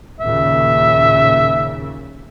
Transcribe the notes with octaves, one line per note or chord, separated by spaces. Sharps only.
D#2 A#2 C#3 E5